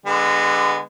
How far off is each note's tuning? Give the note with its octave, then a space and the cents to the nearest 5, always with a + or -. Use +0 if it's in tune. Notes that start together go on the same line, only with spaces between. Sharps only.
D3 +0 G#3 -25 B3 +5